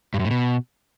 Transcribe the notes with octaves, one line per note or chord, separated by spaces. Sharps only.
G2
F#2
A2
B2